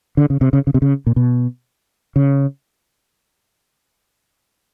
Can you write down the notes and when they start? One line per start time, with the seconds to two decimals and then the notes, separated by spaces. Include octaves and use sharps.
0.17 D3
0.30 C#3
0.41 C3
0.53 C#3
0.67 C#3
0.74 C3
0.82 C#3
1.07 A#2
1.16 B2
2.16 C#3